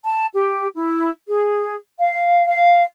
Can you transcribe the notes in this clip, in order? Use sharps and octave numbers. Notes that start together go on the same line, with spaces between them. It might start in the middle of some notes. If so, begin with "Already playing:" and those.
A5
G4
E4
G#4
F5
F5